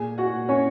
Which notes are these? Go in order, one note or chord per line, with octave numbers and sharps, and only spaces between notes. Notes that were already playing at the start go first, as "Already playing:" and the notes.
Already playing: A#2 G#4 G#5
F#4 F#5
A#2
C#4 C#5